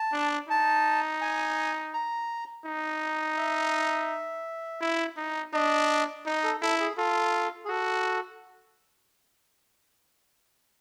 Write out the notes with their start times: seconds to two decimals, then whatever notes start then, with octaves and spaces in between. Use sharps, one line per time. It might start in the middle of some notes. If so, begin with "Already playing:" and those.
Already playing: A5
0.13 D4
0.49 D#4 A5
1.21 G#5
1.94 A#5
2.66 D#4
3.37 E5
4.81 E4
5.17 D#4
5.53 D4 D#5
6.26 D#4 D#5
6.44 A4
6.62 E4 A4
6.80 G#4
6.98 F4 A4
7.65 G#4
7.69 F#4 A4